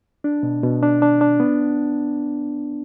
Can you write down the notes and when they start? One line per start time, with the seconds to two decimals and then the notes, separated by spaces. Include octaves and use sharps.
0.24 D4
0.43 B2
0.63 B2
0.83 D4
1.02 D4
1.21 D4
1.40 B3